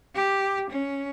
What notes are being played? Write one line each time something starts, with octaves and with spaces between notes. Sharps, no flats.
G4
C#4